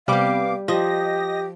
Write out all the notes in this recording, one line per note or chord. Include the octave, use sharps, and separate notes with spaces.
C3 G3 B3 G4 F5 D6
F3 G4 D#5 A#6